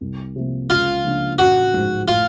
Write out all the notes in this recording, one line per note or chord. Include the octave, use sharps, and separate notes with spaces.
C2
C3 F3 A#3
C#2 F4
C#3 F3 A#3 D4
A1 F#4
G#2 F3
A2 F4